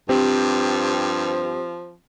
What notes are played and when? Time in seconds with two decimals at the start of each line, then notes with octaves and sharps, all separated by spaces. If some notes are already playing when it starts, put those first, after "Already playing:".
0.09 G2 F3 C4 G4